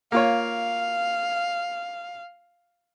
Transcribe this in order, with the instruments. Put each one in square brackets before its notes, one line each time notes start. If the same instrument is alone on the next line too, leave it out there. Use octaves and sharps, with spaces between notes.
[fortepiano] A#3 F4 C#5 [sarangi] F5